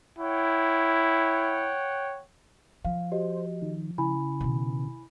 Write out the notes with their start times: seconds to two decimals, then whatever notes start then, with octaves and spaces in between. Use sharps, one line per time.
0.19 E4 C#5 F#5 G5
2.85 F3 F5
3.12 F#4 G4 C5 D#5
3.62 D#3
3.98 C#3 E4 G#5 B5
4.40 B2 D#3